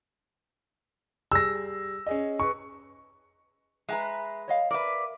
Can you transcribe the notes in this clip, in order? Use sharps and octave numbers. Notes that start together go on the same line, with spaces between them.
G3 G#4 E6 A#6
C#4 G#4 D#5
G#4 B4 C#6
G#3 B4 E5 G#5 A#5
C#5 D#5 F5
A#4 B4 D5 E5